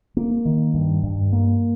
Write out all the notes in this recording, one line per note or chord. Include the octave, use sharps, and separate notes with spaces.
A#3
D#3
G2
G2
A#3